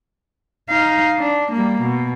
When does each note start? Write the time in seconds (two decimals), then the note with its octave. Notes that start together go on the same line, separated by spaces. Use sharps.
0.70 D#4 F5
1.19 D4
1.52 G3 A#3
1.81 B2